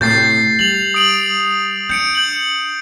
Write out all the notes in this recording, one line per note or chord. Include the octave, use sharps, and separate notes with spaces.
A2 C3 G6 A6 C7
G3 F7 F#7
D#6 D7 F#7
D4 G6 C#7 D7
G6 F#7